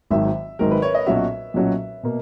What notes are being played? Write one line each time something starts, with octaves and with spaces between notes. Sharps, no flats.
G#1 G#2 D#3 F#3 E5
G#1 G#2 D#3 F#3 A#4
B4
C#5
D#5
B1 A#2 F#3 C#4 F#4 E5
B1 A#2 F#3 C#4 F#4
B2 A#3